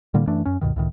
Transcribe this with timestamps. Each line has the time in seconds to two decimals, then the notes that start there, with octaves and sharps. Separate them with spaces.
0.14 A2 D3 G3 A#3
0.27 F#2 E3 A3 D4
0.45 F#2 C#4
0.61 C#2 G2 B2 D#3
0.76 C#2 A2 D#3